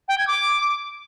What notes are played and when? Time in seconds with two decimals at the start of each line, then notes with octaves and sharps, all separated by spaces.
0.08 G5
0.18 G#6
0.27 D6